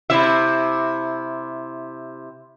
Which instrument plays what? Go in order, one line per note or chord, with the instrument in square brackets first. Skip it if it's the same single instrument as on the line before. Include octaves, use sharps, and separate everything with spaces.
[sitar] C3 E4 E5